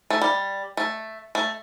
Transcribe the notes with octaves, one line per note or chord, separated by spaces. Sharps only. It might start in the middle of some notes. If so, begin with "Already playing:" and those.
A3
G3
A3
A3